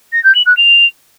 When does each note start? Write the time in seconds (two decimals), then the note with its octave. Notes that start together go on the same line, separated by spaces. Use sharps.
0.13 A#6
0.24 G6
0.35 F#7
0.46 F#6
0.57 F7